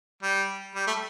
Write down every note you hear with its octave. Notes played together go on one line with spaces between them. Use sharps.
G3
G3
A3